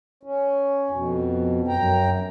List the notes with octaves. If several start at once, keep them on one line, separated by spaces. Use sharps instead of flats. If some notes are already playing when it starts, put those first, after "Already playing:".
C#4
F2 B2
F#2 G5 A#5